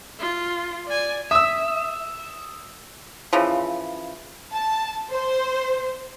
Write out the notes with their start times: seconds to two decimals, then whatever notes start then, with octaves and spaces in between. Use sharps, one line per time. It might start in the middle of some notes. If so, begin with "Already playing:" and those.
0.19 F4
0.86 D5 G#5
1.31 E5 D#6 E6
3.33 C#3 E3 F3
4.52 A5
5.10 C5